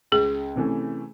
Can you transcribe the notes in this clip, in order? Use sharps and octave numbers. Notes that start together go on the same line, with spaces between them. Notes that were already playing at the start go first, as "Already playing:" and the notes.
C#2 G#4
C3 E3 A3 C#4